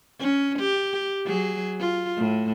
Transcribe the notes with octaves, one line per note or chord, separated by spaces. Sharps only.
C#4
G4
F#3 G#4
F4
A2